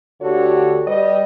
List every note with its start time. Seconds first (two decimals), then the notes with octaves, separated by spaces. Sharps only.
0.21 D2 D3 F#4 G4 A4 C#5
0.87 G3 B4 D#5